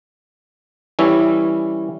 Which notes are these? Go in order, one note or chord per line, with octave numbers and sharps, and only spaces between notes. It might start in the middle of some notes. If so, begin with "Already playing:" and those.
E3 G3 C#4 E4